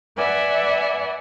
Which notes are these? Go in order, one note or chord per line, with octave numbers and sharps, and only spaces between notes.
B4 D5 E5 F#5 G#5